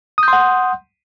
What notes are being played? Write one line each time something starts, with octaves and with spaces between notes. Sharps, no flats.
F#5 C6 D#6 G6